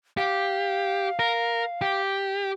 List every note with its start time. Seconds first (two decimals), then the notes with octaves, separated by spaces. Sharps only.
0.17 G4 F5
1.19 A#4
1.81 G4